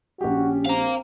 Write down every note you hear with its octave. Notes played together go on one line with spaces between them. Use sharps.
A#1 C#4 F#4 G4
C4 F5 A#5